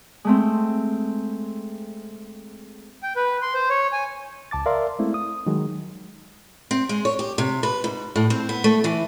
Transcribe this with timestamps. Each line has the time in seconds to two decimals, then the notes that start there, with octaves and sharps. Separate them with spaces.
0.25 G#3 A3 C4
3.03 G5
3.16 B4
3.42 C6
3.54 C5
3.70 C#5
3.92 G#5
4.51 C#2 A5 D6 A6
4.66 A#4 D5 E5 F5 C6
4.99 G#3 A3 C4 E4
5.14 D#6
5.46 D#3 F#3 G#3
6.71 C4
6.89 G#3
7.05 C#5
7.19 G4
7.38 C3
7.63 B4
7.84 G#2
8.16 A2
8.30 C4
8.49 B3
8.64 A3
8.84 E3